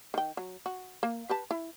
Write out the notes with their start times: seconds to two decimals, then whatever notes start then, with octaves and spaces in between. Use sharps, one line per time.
0.14 D#3 G5
0.37 F#3
0.66 F#4
1.03 A#3
1.29 G4 B4 A5
1.51 E4